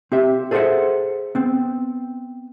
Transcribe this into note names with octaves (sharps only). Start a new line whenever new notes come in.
C4 G4 E5
G#4 A4 C5 C#5 E5 F#5
B3 C4